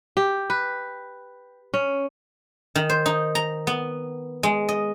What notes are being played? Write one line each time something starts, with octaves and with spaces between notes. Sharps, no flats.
G4
B4
C#4
D#3
C5
D#4
A#5
B3
G#3
D#5